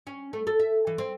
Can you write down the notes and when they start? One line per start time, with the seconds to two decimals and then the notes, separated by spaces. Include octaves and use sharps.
0.07 C#4
0.33 A3
0.47 A4
0.59 E5
0.87 E3
0.98 C4